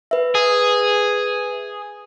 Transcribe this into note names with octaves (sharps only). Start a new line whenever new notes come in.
B4 E5
G#4